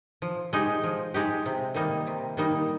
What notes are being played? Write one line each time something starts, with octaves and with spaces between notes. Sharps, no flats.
F3
G#3 D#4 G4
F3
G#3 D#4 G4
C3
D#3 G3 A#3 D#4
C3
D#3 G3 A#3 D#4